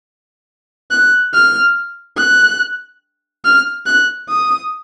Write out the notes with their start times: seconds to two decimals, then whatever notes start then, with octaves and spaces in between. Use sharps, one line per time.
0.91 F#6
1.34 F6
2.17 F#6
3.45 F6
3.86 F#6
4.29 D#6